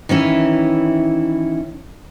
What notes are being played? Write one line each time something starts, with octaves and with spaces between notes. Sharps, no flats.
D#3 E3 C#4 E4